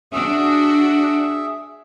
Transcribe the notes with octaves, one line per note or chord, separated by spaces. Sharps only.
D4 F#4 G#4 E5